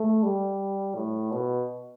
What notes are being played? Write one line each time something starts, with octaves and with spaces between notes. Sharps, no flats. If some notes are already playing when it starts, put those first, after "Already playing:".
Already playing: A3
G3
A2
B2